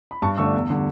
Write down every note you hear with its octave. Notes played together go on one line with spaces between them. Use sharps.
B5
G2 A5 C#6
D3 A3 D4 C#6 E6
E2
D3 G3